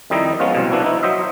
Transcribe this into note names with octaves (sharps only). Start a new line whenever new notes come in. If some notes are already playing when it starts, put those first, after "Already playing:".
F2 D#3 G3 D#4 E4 D#5
F3 G#3 B3 C#4 F4
C2 B2
F3 B3 D4 E4 F#4
D#4 E4
F#3 C5 D#5 E5